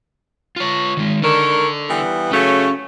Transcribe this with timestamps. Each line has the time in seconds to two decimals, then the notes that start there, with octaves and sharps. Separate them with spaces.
0.56 F4 C#5
0.97 D#3 G#3
1.22 D3 D#3 A4 A#4 C#5
1.88 E3 G3 B3
2.32 C#3 F#3 A3 C#4